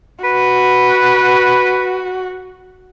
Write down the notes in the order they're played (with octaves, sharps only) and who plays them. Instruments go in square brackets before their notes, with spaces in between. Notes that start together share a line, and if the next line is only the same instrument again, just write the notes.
[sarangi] F#4 [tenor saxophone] B4